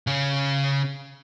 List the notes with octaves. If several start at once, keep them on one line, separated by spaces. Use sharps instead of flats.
C#3 C#4